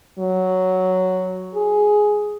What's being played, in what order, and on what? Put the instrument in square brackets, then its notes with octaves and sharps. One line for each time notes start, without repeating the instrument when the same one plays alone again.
[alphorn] F#3
G#4